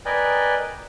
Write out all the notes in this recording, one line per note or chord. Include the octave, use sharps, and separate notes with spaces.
A#4 B4 D5 D#5 G5 G#5